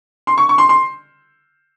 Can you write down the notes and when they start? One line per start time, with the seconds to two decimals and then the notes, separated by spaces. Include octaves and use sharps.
0.27 C6
0.38 C#6
0.49 C#6
0.58 C6
0.69 C6